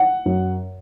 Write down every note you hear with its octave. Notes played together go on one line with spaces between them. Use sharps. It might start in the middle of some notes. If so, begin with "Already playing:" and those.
Already playing: F#5
F#2